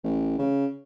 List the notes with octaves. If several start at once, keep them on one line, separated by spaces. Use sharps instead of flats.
A1
C#3